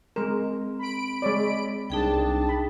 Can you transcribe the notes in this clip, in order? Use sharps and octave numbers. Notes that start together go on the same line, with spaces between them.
G#3 C4 A#4
B5 D7
G#3 C#5 D5
C2 D4 D#4 G#4 G5 A5
B5